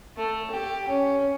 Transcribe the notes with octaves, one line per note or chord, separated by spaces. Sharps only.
A3
G4
C#4